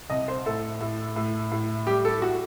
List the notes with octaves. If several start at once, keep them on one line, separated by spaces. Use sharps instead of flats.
C2 D#5
C5
A2 A4
A2
A2
A2
G3 G4
A4
F#4